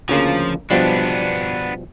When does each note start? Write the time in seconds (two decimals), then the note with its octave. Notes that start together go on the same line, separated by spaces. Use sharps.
0.09 D2 C#3 F3 A#3
0.71 B2 F3 G3 B3 D4